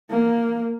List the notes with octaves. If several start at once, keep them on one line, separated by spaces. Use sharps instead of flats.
A#3